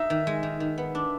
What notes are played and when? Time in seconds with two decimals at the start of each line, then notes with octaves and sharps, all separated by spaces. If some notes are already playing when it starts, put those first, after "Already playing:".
Already playing: D#4 E5
0.10 D#3
0.27 G#3
0.43 D#3
0.60 D#3
0.78 B3
0.95 D4